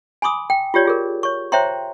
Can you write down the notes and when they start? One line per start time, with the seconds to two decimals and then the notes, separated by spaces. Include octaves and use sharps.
0.22 G#5 B5 C6 D6 D#6
0.50 G5
0.74 F4 G4 C#5 D5
0.85 F4 G#4 A#4
1.23 C#5 C#6
1.52 C5 C#5 E5 G5 A#5 C6